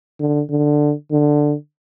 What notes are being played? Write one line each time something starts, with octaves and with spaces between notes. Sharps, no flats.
D3
D3
D3